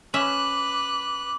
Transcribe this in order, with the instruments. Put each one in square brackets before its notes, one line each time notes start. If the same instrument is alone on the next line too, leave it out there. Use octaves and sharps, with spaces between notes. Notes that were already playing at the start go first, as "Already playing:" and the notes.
[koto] C#4 E5 [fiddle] B4 F#6 [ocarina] D6